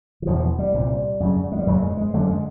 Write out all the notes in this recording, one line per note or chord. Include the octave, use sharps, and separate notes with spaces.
E3
E2 B2 F3
G3
C2 A#2
F#2 C#3
G#3
G3
F#2 C#3 F#3
G#3
G#3
F#2 D3 A3
G3
G#3